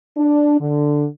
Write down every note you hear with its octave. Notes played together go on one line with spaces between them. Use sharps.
D4
D3